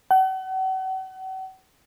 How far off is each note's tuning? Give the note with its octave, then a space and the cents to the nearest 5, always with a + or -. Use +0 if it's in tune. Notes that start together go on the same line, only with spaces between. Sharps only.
F#5 +40